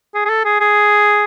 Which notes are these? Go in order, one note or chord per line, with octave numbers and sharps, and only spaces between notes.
G#4
G#4
A4
G#4
G#4